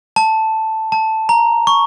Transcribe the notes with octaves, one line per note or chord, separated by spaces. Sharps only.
A5
A5
A#5
C#6